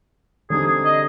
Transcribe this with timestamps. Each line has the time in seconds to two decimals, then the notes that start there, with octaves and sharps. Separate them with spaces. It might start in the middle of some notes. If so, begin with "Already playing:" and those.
0.50 D3 G3 C4 D#4 G#4
0.67 G#4
0.85 D#5